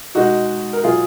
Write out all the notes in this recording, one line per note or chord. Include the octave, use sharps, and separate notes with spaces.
B2 G#3 D#4 F#4
A#4
B2 F#3 F4 G#4